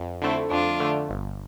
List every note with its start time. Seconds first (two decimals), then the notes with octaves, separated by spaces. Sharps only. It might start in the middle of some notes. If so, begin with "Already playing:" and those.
Already playing: F2
0.22 D3 A3 C4 E4
0.51 F2 D4 F4
0.80 D3 A3
1.09 G1